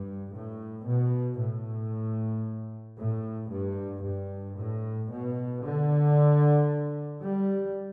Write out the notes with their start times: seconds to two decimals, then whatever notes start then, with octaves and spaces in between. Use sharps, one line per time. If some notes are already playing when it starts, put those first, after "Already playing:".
Already playing: G2
0.34 A2
0.86 B2
1.39 A2
2.98 A2
3.51 G2
4.04 G2
4.58 A2
5.11 B2
5.63 D3
7.23 G3